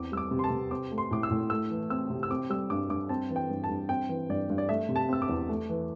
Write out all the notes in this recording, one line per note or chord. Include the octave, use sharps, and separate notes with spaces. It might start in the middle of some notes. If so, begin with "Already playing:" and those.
Already playing: E2 C4 D6
G3 E6
D6
C3
C6
A5
C3
C4 D6
A3
C6
A2 D6
E6
A2
A3 E6
E3
C4 E6
C3
E6
C4 D6
G3 E6
G2 D6
G2 D6
C4 A5
E3
G5
G2
A5
G2
C4 G5
E3
G2 D5
G2
D5
A3 E5
C3
A5
C4 E6
D6
E2
A3
E3